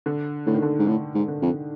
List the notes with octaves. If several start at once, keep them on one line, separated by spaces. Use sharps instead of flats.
D3
A2 D3
D#3
D3
G#2
A2 D3
G#2
D3
F2